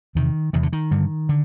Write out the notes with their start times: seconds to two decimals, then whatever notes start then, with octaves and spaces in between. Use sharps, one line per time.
0.15 E2 C3 D#3
0.53 E2 C3 D#3
0.63 D3
0.73 D#3
0.91 G2 D3
1.29 D3